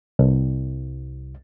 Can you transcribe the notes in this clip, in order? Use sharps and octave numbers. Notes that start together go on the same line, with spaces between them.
C2